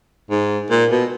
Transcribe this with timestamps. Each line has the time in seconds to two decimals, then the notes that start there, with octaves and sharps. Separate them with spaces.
0.30 G#2
0.70 A#2
0.90 B2